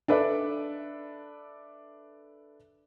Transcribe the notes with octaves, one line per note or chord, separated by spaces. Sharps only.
D4 A4 B4 D5 E5